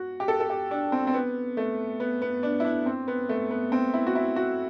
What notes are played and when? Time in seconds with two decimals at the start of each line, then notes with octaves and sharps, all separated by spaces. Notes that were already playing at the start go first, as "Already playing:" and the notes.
Already playing: F#4
0.20 G4
0.28 A4
0.40 A4
0.50 G4
0.71 D4
0.92 C4
1.07 C4
1.14 B3
1.57 A3
2.00 B3
2.22 B3
2.43 D4
2.60 E4
2.65 D4
2.86 C4
3.08 B3
3.29 A3
3.51 B3
3.72 C4
3.94 E4
4.07 F#4
4.15 E4
4.36 F#4